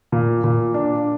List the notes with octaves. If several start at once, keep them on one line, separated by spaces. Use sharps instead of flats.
A#2
A#2
D4